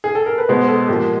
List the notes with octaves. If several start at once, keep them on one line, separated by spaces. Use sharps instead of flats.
G#4
A4
A#4
B4
B2 G#3 C5
A4
A#2 F3 G#3 G4